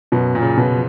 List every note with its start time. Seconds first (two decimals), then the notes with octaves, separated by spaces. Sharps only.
0.12 F#2 B2
0.35 A#2
0.42 C#3
0.57 B2
0.73 F3